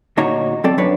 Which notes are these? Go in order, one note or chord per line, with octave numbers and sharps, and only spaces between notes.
D2 A#2 D#4 F#4 C#5 A#5
F#3 C4 A4 D5
B1 F#2 D4 B4 C#5